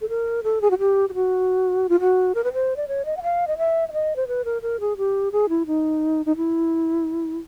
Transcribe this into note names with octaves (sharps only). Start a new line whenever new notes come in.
A4
A#4
A4
G#4
F#4
G4
G4
F#4
F4
F#4
A#4
B4
C5
D5
C#5
D#5
F#5
F5
D#5
E5
E5
D#5
C5
B4
A#4
A#4
G#4
G4
G#4
E4
D#4
D#4
E4